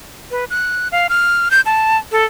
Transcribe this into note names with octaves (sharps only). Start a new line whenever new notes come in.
B4
F#6
F5
F6
G6
A5
A4